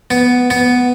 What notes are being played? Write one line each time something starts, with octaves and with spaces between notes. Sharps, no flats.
B3
B3